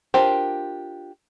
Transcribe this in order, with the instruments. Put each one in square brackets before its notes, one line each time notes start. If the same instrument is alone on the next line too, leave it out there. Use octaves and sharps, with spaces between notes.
[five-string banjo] D4 F4 G4 A#4 C5